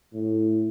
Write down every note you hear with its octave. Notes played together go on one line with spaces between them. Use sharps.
A2